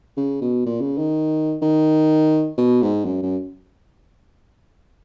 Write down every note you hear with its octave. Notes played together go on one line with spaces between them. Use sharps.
C#3
B2
A#2
C#3
D#3
D#3
B2
G#2
F#2
F#2